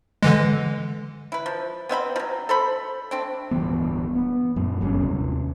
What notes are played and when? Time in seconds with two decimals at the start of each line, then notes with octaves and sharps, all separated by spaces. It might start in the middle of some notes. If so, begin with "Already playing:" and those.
0.23 D3 E3 G#3
1.32 E4 B4
1.46 F3
1.89 B3 C4 E5 B5
2.16 F3 F#3
2.49 A4 C5 B5
3.11 A3 C4 D4
3.51 D1 G2 E3 B3
4.15 B3
4.56 F#2 A#2
4.81 G1 G2 E3 C#4
5.01 D#2 C3